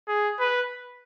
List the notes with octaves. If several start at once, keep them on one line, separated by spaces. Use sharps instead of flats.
G#4
B4